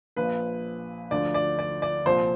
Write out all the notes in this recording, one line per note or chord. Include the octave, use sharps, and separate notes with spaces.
A#1 A#2 F3 B4
D2 D3 F3 D5
D5
D5
D5
C2 A#2 F3 C5